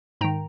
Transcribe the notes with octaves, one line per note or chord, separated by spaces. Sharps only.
G#2 D#3 G5 A#5